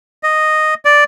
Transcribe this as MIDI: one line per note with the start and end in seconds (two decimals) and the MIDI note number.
0.23 0.74 75
0.85 1.04 74